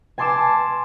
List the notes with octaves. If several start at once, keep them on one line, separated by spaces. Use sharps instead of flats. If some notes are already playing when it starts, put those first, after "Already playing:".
G#5 A5 C6 D6 E6 E7